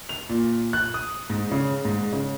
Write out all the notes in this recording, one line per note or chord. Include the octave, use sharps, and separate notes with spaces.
F7
A#2
F#6
D#6
G#2
C#3
G#2
C#3